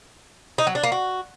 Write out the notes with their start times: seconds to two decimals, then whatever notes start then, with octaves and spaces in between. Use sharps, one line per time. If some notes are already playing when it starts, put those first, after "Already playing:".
0.58 D#4
0.67 F#3
0.75 D4
0.83 A#3
0.92 F#4